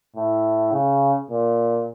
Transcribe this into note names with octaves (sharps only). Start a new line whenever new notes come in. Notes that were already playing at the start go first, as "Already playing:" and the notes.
A2
C#3
A#2